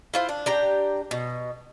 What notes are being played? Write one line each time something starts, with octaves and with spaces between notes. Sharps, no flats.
E4 F4 C5
D4
D4 G4 A#5
B2